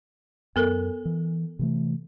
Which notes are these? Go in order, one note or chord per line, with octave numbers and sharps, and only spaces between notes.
F#2 B3 A4 A#4
E3
C3 E3 A3